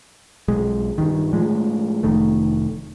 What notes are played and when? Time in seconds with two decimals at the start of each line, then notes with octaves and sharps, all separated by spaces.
0.48 B1 G#3
0.98 G2 D#3
1.33 A2 F3 G#3
2.03 F1 D#3 A3